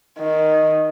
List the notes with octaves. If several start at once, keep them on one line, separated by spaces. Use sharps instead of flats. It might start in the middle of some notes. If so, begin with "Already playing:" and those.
D#3